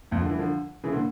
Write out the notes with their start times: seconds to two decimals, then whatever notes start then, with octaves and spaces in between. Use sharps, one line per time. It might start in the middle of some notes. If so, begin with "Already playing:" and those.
0.11 F2 A2
0.20 D3 F3
0.29 E3 G3
0.38 D3 F3
0.84 C#3 E3
0.92 A#2 D3